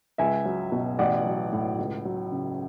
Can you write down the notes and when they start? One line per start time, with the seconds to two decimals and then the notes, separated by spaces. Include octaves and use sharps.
0.18 C#2 E5 G#5
0.45 F#3
0.72 B2
0.99 A1 D5 F#5
1.25 F#3
1.53 A2
1.79 C#2
2.05 F#3
2.32 C#3